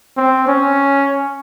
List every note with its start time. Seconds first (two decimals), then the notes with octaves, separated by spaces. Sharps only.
0.17 C4
0.47 C#4